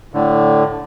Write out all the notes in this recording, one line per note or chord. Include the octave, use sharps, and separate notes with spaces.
A2 D3